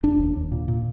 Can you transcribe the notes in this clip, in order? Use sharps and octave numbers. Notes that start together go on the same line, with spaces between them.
F1 D4
D#2
D#2
A#2
A#2